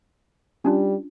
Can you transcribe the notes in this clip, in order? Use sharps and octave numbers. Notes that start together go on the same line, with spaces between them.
G3 C#4 D4 F4